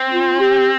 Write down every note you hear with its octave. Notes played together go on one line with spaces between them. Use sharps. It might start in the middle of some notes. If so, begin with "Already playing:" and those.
Already playing: C4
F4
G4